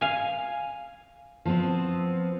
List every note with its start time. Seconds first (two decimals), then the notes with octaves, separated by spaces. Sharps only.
0.01 F5 G#5
1.45 F3 B3 C4